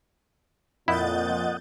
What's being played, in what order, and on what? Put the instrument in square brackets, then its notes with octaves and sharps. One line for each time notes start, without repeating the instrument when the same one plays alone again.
[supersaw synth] F2 G6 A6 [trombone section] A#2 [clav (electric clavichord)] E4 [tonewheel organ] D#5 F#5